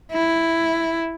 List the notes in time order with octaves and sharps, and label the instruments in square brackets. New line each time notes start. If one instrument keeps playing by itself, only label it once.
[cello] E4